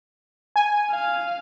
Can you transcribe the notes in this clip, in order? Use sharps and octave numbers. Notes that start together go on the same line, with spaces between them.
G#5
F5